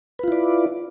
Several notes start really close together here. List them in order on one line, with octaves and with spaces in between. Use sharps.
B4 F4 E4 D5